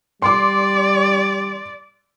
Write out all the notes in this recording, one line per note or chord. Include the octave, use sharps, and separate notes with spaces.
G3 D5 C6 D6